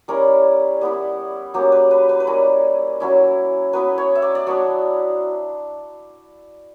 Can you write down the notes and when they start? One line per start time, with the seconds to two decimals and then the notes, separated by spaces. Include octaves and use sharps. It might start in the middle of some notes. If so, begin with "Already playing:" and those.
0.08 G3 C#4 E4 A#4
0.81 G3 B3 E4
1.54 F#3 A#3 C#4 G4
1.72 B4
1.91 B4
2.09 B4
2.20 B4
2.27 G3 C#4 E4 A#4
3.00 F#3 C#4 E4
3.73 F#3 B3 E4 B4
3.98 C#5
4.15 E5
4.22 D5
4.35 D5
4.47 F#3 B3 D4 C#5